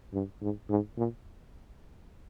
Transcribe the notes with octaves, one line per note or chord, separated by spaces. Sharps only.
G2
G#2
G#2
A#2